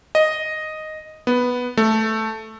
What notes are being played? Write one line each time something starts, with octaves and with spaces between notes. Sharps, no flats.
D#5
B3
A3